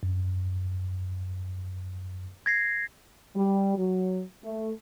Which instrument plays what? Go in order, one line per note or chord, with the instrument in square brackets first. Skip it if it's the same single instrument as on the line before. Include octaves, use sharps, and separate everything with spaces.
[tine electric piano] F#2
[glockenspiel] G#6 A#6 C7
[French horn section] G3
F#3
A3